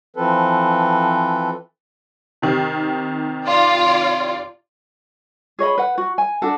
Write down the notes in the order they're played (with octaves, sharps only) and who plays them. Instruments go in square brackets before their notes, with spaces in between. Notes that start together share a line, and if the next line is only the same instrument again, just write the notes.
[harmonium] E3 F3 C4 A4 B4
[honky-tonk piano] C3 D#3
[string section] F4 D5
[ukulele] G#4 C#5 D#5 B5
B4 F#5
F#4
G#5
D4 F#4 A4